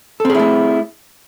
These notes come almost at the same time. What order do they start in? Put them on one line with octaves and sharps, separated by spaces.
A4 C4 G#4 E4 A3